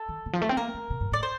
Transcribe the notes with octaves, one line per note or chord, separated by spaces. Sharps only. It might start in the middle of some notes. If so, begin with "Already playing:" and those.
Already playing: A4
D#3
D3
F3
A3
C4
A#3 A#4
A3
C3
G2
A2 D5
C5